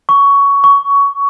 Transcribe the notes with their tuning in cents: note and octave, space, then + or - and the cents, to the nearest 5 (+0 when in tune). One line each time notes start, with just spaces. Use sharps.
C#6 +15
C#6 +20